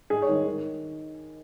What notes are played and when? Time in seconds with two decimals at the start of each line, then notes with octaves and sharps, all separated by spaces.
0.10 G#2 G#4
0.22 C#5
0.28 D#3 G#3
0.46 D#3